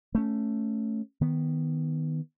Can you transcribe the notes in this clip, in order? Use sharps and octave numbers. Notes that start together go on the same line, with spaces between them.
A3 C#4
D#3 B3